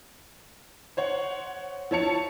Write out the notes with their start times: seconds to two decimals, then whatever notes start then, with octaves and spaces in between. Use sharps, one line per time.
0.97 C5 C#5 F#5
1.91 F3 E4 C#5 A5 C#7 F7